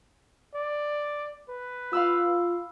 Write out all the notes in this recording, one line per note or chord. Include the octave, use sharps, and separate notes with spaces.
D5
B4
F4 F5 B5 E6